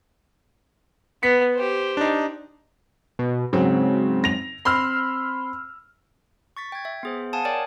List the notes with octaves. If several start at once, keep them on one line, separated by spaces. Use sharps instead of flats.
B3 B6 C#7
G4 C5
D4 D#4
B2
G#2 C#3 F#3 C4
A#6 F7
C4 B5 C6 E6 F6
C#6 A6 B6
G5 G#6
E5
B3 G#4 C5
F5 F#5 G#5 A5 D#6
A#4 C#5 D5 G5